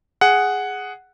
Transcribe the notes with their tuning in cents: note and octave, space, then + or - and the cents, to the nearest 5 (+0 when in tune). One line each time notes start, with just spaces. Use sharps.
G#4 +0 F#5 +0